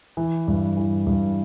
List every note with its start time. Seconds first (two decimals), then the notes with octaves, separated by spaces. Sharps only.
0.17 E3
0.48 G2
0.77 E3
1.07 G2